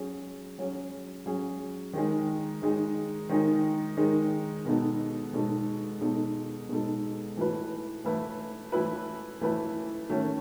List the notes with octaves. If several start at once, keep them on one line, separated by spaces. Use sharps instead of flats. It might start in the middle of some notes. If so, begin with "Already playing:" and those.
Already playing: F#3 C#4 G#4
F#3 C#4 G#4
F#3 C#4 G#4
D#3 G#3 D#4 G#4
D#3 G#3 D#4 G#4
D#3 G#3 D#4 G#4
D#3 G#3 D#4 G#4
B2 G#3 B3 D#4 A4
B2 G#3 B3 D#4 A4
B2 G#3 B3 D#4 A4
B2 G#3 B3 D#4 A4
E3 A3 E4 B4
E3 A3 E4 B4
E3 A3 E4 B4
E3 A3 E4 B4
D#3 A3 C#4